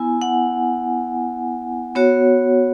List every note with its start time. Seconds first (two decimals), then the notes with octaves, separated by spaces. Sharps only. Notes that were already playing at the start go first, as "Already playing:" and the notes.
Already playing: B3 E4 G#5
0.22 F#5
1.95 B3 F#4 C#5